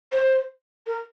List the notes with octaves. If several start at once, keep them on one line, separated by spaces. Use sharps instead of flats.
C5
A#4